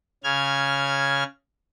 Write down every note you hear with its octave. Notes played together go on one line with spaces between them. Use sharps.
C#3 F6 G#6